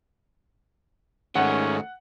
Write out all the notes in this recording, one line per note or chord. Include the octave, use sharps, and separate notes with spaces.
G#2 D#3 A3 C#4 F#5